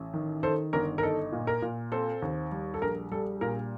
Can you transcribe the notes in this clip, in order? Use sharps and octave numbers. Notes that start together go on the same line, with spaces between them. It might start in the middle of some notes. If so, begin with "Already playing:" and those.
Already playing: A1
D#3
D#3 A4 C5
G1 A#4
A#4
D#4 A4
A#2
A#4
A#2
C4 A4 C5
D#2
G3
A4
A#1 A#4
G3 A4
A#2 A#4